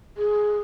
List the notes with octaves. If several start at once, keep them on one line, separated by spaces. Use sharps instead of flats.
G#4